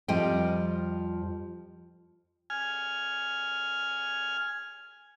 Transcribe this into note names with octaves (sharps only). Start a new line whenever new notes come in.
F2 F3 G3 D#5 G5
G#5 F6